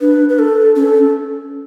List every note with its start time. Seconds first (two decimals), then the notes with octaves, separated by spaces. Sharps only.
0.01 D4 B4
0.29 B4
0.39 A4
0.76 C#4 A4